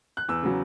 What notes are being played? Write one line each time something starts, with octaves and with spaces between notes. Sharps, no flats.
F#6
E2 E6
C#3 F#3